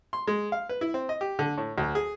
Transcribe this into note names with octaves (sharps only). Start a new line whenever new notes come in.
C6
G#3
F5
B4
E4
C4
D#5
G4
D3
A2
D2
G#4